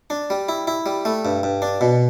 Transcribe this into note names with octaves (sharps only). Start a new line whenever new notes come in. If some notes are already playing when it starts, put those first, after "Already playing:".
D4
G3
E4
E4
G3
A3
G2
G2
D4
B2